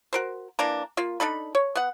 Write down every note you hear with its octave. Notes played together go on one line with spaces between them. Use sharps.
F#4 A#4 C5
E3 A#3 D4 A#5
A#3 F4
D4 D#4 A4 B5
C#5
B3 F#5